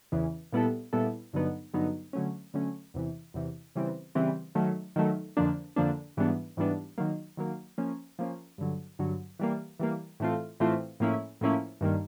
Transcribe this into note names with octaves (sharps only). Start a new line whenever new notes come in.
E2 C#3 E3
A#2 G3 B3 E4 A4
A#2 G3 B3 E4 A4
G2 D3 F#3 B3 D#4
G2 D3 F#3 B3 D#4
D3 F#3 A3 C#4
D3 F#3 A3 C#4
E2 C3 E3
E2 C3 E3
C#3 E3 G3 C4
C#3 E3 G3 C4
D#3 F#3 A3
D#3 F#3 A3
F2 D3 F3 A#3 D4
F2 D3 F3 A#3 D4
G#2 E3 G3 B3 D4
G#2 E3 G3 B3 D4
D#3 F#3 A#3
D#3 F#3 A#3
F3 A#3 C#4
F3 A#3 C#4
G2 D3 F#3
G2 D3 F#3
E3 G3 A#3
E3 G3 A#3
A2 E3 A3 C4 F4
A2 E3 A3 C4 F4
A2 F3 A#3 C#4 E4
A2 F3 A#3 C#4 E4
G2 D#3 G3 A#3